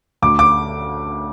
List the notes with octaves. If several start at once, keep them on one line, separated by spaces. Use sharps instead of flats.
D2 D6
D6